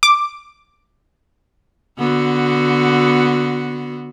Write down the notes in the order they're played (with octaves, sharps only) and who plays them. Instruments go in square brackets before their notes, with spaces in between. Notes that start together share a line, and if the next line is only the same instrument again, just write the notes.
[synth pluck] D6
[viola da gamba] D3 B3 F#4